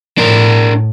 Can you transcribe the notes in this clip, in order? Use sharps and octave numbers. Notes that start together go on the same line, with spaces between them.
A2 D4 A#4